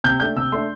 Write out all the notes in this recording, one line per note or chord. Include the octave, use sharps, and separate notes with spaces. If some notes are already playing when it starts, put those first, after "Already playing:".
C3 G6
A3 D4 G6
C3 E6
A3 D4 C6